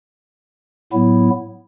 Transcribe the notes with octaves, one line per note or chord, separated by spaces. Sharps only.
A2 F#3 B3 E4